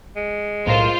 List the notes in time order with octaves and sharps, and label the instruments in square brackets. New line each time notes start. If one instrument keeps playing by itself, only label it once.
[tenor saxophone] G#3
[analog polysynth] B1 A2 A#4 [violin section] F4 C5